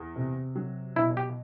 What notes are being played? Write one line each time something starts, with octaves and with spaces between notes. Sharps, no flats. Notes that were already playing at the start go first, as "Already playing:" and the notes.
Already playing: E2
C3
F#3
B2 E4
G4